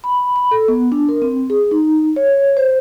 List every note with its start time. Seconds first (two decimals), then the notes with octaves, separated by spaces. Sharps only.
0.04 B5
0.36 B5
0.51 A4
0.68 B3
0.92 D4
1.09 A#4
1.22 C4
1.50 G#4
1.71 D#4
2.16 C#5
2.57 C5